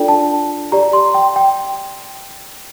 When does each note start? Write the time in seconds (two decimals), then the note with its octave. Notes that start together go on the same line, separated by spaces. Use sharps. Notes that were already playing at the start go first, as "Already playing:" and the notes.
Already playing: D4 F4 A4 D5 G5
0.08 A5
0.72 G4 D5 A#5
0.93 C6
1.14 G5
1.36 G5